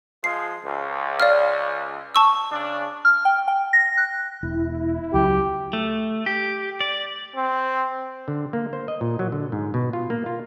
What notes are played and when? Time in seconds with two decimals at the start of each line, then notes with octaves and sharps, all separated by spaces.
0.24 F3 G#3 C7
0.65 C#2
1.20 D5 F5 F6
2.15 A5 C#6 E6
2.51 C#3 D4
3.05 F6
3.25 G5
3.48 G5
3.73 A#6
3.97 F#6
4.43 E1 E4
5.14 C#2 F#3 G4
5.73 A3
6.26 G4
6.81 D5
7.36 C4
8.28 D3
8.53 A#3
8.73 C5
8.88 D#5
9.01 A#2
9.19 F#3
9.32 D3
9.52 G#2
9.74 B2
9.93 F4
10.10 A#3
10.26 F4